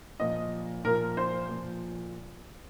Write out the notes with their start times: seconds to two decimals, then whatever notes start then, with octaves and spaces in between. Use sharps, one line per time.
0.20 A#2 F3 D#5
0.84 A#2 F3 A#4
1.17 C5
1.49 A#2 F3